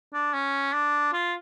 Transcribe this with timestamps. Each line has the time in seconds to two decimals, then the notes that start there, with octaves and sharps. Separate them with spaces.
0.13 D4
0.33 C#4
0.73 D4
1.13 F4